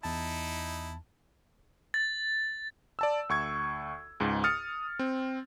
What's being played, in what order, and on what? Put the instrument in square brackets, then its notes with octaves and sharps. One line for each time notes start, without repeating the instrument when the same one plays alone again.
[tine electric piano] E2 A5 [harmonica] D#4 E4
[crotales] A6
[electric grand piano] D5 A5 E6
D2 C#6 G#6
C#2 G#2
D#6 F6 A6 C#7
C4